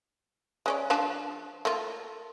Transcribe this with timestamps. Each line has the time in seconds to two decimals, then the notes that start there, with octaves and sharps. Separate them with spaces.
0.66 G#3 C#4 D5
0.90 F3 D4 A5
1.65 A3 A#3 F4